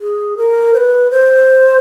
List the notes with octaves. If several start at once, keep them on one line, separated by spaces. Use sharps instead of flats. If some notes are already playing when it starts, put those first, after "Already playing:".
G#4
A#4
C5
B4
C5